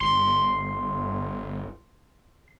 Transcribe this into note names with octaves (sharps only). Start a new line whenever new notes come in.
G1 C6